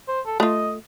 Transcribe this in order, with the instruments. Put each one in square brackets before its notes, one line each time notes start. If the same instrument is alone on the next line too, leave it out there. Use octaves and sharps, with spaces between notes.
[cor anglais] C5
A4
[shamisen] A3 F4 [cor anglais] D#5